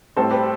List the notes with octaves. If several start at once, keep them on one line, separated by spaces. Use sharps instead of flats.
A2 G3 C4 A4 C5
G4 B4